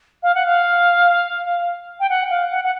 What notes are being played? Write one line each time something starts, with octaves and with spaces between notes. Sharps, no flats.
F5
F#5
F5
G5
F#5
F5
F#5
F#5